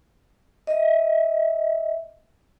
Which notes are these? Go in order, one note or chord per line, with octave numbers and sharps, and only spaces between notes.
D#5 E5